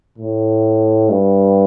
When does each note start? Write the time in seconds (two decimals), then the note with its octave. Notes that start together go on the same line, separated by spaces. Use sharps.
0.18 A2
1.09 G2